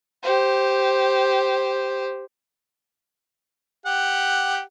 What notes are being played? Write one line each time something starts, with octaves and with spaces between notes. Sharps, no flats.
G4 C5
G4 F#5